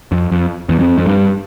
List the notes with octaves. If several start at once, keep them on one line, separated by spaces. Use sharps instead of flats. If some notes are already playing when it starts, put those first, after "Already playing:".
F2
F2
E2
F2
F2
G2